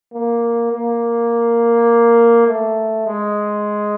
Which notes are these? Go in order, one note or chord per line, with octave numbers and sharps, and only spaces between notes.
A#3
A#3
A3
G#3